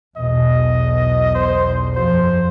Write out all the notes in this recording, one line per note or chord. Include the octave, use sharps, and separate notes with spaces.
B1 E2 B2 D#5
C5
F#2 F3 C5